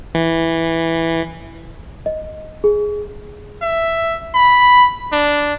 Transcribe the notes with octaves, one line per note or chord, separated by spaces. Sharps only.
E3
D#5
G#4
E5
B5
D4